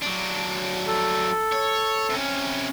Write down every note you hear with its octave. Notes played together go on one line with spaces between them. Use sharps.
F#3 D4
A4
C#5
C3 C#4